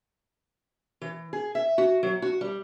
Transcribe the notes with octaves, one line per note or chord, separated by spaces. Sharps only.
E3
G#4
E5
F#4
F#3
F#4
G3